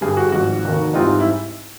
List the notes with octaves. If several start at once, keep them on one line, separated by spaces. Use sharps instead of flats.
G2 D3 G3 G#4
F#4
G#1 G#2 F3 F#4
F1 D#2 D#3
G#2 E3 G3 C4 D#4 F4
E4